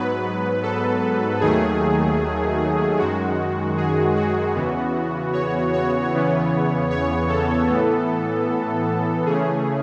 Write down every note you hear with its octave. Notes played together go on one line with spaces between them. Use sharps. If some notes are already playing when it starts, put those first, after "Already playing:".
Already playing: G#2 F#3 B3 B4
A4
D#2 D#3 F#3 A3 G#4
F#2 D#3 G#3 F#4
G#4
F#4
E2 C#3 E3 B3
C#5
C#5
E2 C#3 E3 B3
C#5
A4
A2 E3 B3
C#3 E3 A3 C#4 G#4